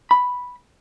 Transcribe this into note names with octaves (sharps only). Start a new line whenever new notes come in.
B5